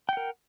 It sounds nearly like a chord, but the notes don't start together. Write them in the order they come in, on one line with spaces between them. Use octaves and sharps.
G5 F#5 A#4